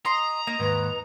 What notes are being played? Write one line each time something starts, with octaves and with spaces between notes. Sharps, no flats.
D#5 A#5 C6
A#3 D#4
D#2 G#2 B4